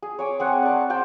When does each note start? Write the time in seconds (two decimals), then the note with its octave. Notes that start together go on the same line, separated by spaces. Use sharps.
0.02 G#4
0.19 C#5 G#5 D6
0.40 C4 G#4 F#5
0.62 D5 A5
0.90 C4 F#5 G5 A5